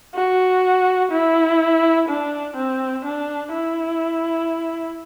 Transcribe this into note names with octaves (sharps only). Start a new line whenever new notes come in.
F#4
E4
D4
C4
D4
E4